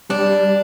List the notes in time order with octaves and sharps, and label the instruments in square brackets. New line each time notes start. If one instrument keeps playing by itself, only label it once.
[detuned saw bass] G3 [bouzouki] D4